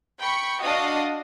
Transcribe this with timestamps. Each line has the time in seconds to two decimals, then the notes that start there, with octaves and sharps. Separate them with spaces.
0.19 G5 B5 C#6 C#7
0.62 D4 F#4 D#5 F5 D#6